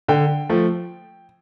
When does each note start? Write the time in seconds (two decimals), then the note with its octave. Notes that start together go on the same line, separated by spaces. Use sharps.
0.08 D3 G5
0.49 F3 A3